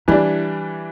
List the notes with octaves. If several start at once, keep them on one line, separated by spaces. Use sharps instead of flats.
E3 G3 D4 E4